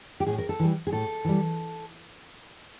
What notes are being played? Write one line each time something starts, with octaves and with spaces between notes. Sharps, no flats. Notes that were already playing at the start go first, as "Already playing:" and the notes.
G4
A2 G#4
A#4
A4
E3 G3
G#4
A2 A4
E3 G3